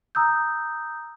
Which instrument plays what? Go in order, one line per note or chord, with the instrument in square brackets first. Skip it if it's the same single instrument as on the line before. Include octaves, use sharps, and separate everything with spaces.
[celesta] A#5 D#6 E6 G6